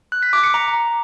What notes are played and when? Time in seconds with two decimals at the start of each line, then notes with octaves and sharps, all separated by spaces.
0.12 F#6
0.23 B6
0.33 D6
0.44 C#7
0.54 A#5